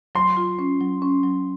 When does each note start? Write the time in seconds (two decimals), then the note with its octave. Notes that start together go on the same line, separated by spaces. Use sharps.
0.15 F#3 C6
0.37 F4
0.59 C#4
0.81 F#3
1.02 C#4
1.23 F#3